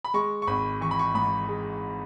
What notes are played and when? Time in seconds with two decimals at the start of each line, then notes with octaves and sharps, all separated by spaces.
0.04 B5
0.14 G#3 C#6
0.42 C#6
0.47 G#1 B5
0.81 E3 C#6
0.91 B5
0.99 C#6
1.14 G#2 B5
1.48 G#3